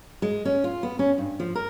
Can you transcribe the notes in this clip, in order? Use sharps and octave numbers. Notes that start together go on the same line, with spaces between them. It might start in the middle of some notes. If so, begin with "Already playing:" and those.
G#3
C#4
F4
B3
C#4
G2
F3
A#4